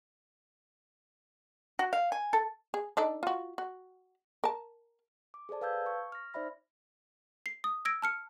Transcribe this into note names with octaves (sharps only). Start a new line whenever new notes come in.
F#4
F5
G#5
A4
G#4
D4 D#4 A4
F4 F#4
F#4
A#4 A5
D6
G#4 A4 C5 D5 A5
B4 F5 A5 E6 G6 G#6
C#6
F6 A#6
D#4 C5 D5 E5 B5 A#6
C7
D#6
E6 G#6 A#6 D7
A5 F6 C#7